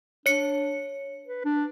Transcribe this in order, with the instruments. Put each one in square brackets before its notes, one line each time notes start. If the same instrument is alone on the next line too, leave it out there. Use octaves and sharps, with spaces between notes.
[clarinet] D4 [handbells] C#5 C#7
[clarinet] B4
D4